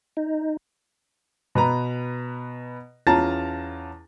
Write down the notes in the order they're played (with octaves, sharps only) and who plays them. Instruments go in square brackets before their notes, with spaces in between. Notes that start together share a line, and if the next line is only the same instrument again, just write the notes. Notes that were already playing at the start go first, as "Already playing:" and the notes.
[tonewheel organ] D#4
[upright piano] B2 B4 A#5
E2 C#4 F4 A5 A#5 A6